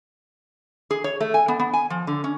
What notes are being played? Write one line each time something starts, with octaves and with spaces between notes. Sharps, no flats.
G#4
C#5
A3
G#5
B3
B3
G#5
F3
D3
C#4